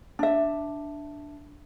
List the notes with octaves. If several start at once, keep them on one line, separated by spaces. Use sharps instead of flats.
D4 E5